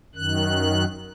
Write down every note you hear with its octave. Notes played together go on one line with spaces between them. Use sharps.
F#2 D#3 F#6